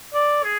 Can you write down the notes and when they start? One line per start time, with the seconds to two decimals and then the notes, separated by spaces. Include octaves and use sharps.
0.14 D5
0.44 G#4